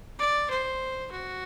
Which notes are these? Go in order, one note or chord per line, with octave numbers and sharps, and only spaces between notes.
D5
C5
F#4